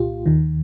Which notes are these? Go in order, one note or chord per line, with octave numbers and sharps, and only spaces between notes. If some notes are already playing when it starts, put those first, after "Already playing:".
Already playing: C2 A#2 F4 G4
D#2 D#3